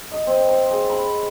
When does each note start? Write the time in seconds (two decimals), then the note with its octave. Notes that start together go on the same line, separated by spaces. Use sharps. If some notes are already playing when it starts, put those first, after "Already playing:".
0.12 D#5
0.27 C4
0.47 C5
0.70 G#4
0.89 B5